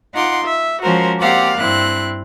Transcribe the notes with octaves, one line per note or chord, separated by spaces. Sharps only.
D#4 F4 F#5 C6 D6
E5
F3 G#3 C#4 F#4 A#4 C5
A#3 C4 G4 D5 F5 F#5
G2 C4 E4 F#6